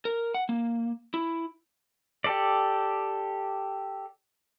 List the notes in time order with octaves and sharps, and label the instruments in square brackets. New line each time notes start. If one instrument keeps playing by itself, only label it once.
[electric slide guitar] A#4
F#5
A#3
E4
[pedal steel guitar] G4 A4 D5